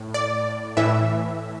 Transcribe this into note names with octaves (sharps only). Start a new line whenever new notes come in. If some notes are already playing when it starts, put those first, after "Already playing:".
Already playing: A2
D5
A2 E3 E5